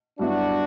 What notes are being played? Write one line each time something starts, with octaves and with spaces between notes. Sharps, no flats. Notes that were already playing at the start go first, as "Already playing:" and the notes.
G2 F#3 B3 D4 E4 F#4